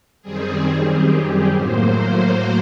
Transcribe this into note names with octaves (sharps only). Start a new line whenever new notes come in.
F#2 D#3 G3 C4 G#4
G4
A2 F#3 A#3 C5